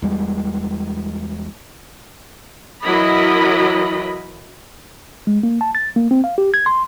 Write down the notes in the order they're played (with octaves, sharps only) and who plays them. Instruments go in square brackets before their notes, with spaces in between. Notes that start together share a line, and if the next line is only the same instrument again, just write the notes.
[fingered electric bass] E2 G3 G#3
[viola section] E3 F#3 E4 A#4 D#5 B5
[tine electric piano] G#3
A#3
A5
A6
A#3
C4
F5
G4
G#6
C6